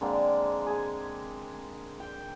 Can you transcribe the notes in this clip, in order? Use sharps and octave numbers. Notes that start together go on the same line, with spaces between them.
D3 G#3 A#3 C4
G#4 G#5
G5